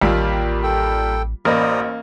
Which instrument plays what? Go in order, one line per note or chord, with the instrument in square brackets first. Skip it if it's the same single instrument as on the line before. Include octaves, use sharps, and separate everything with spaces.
[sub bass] A1 [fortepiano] D#2 E6 [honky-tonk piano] G3 A#3 F4
[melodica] A4 G5
[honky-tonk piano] A1 C5 B5 [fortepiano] A#3 D#5 [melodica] D5 A#5 D#6